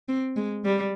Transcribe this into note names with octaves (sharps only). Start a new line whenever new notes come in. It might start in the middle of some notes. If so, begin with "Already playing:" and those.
C4
G#3
G3